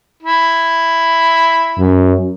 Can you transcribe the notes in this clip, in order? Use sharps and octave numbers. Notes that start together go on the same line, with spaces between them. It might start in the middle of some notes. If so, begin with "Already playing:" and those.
E4
F#2